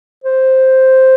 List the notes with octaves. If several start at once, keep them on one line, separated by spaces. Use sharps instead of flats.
C5